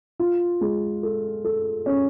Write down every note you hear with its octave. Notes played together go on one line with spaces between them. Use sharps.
F4
G#3
A4
A4
C#4